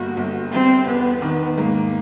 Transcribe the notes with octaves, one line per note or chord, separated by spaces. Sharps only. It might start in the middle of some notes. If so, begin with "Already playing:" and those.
Already playing: G1 G2 A#3 F#4
G1
G3 C4
E2 B3
D#3 B3
G#2 A#3